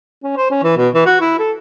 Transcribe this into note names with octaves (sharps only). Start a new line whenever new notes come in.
C#4
C5
C#4
E3
B2
E3
F#4
E4
A4